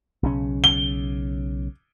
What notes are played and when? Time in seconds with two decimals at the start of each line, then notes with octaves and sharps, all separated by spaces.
0.23 B1 C#3 C#4
0.64 G7